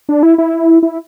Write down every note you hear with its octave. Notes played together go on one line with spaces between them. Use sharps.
D4
E4
E4
E4